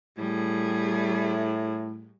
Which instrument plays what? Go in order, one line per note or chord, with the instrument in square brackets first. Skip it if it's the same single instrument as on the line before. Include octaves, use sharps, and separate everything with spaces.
[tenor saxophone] A2 [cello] G3 G#4